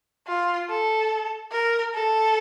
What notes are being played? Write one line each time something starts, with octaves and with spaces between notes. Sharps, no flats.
F4
A4
A#4
A4